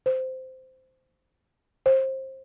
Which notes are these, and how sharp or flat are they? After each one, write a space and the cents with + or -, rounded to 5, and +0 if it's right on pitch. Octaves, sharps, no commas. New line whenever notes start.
C5 -10
C5 +25